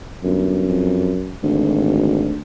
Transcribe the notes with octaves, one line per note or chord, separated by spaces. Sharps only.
G1 F#2
F2
G#1 D2